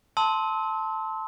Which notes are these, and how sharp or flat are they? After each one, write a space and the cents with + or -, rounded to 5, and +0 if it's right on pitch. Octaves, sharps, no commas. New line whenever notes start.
A5 +0 C6 +0 E6 -35